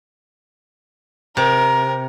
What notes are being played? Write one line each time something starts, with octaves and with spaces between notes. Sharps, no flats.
C3 A#4